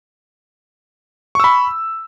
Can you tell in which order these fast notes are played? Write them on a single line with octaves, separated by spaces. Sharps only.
C#6 E6 B5